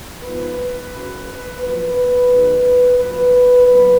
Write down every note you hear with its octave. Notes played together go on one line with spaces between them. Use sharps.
G#2 F3 B3 B4
F#2 C#3 F#3
F#2 F3 A#3 B4
F#2 D#3 G#3 B3
F#2 F3 A#3 B4
B2 F#3 A#3 B4